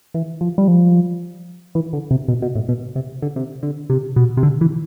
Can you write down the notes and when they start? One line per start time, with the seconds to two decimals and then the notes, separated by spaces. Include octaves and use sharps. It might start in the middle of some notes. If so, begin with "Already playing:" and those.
0.14 E3
0.41 F3
0.58 G3
0.68 F3
1.75 E3
1.93 D3
2.11 C3
2.28 B2
2.42 B2
2.55 A2
2.69 B2
2.95 C3
3.22 D3
3.36 C3
3.63 D3
3.90 C3
4.16 B2
4.37 C3
4.43 D3
4.61 E3